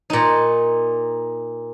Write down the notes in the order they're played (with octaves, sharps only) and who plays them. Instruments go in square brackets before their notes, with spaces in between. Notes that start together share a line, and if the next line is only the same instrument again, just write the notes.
[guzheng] A#2 D#4